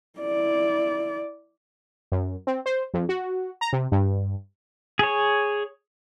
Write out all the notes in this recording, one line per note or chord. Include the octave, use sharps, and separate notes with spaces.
E4 D5
F#2
C4
C5
F2
F#4
A#5
C3
G2
G#4 C#5